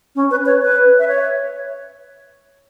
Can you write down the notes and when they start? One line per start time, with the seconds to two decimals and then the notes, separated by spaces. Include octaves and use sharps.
0.15 C#4
0.31 B4
0.46 C#5
0.62 B4
0.99 E5
1.08 C#5